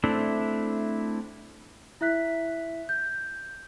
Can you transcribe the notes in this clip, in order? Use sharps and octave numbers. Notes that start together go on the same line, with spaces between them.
A3 C4 D4 E4
E4 E5 F#6 B6
G6